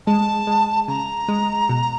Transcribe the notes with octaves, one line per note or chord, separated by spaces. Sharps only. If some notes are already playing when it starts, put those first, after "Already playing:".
G#3 A5
G#3
C#3 A#5
G#3
B2